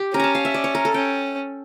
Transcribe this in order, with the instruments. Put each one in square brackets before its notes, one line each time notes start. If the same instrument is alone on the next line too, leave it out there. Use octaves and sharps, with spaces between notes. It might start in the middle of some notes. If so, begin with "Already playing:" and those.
Already playing: [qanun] G4
[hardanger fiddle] C#4 [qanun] A#4
[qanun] A5 A#5
F5
E5
D5
C#5
A#4
A4
[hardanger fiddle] C#4 [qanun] G5